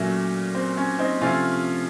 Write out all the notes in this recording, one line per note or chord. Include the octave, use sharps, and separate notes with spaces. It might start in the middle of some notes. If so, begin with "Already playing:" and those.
Already playing: A#2 F#3 A3 C#4
C4
C#4
C4 D#4
C3 F3 A3 C#4 F4